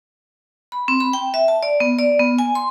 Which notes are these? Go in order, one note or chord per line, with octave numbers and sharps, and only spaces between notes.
B5
C4
B5
G5
E5
A5
D5
B3
D5
B3
G#5
C6